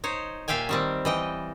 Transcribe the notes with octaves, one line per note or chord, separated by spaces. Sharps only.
D#4 C5 C#5
A#2 G4 E5 F5 G5 G#5
D#3 G3 C4
E3 D#5 G5